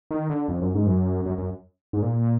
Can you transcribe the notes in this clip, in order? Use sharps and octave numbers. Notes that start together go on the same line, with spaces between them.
D#3
D3
F2
F#2
G#2
F#2
F#2
F#2
G#2
A#2